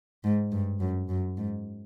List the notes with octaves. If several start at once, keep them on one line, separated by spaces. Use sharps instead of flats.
G#2
G2
F#2
F#2
G#2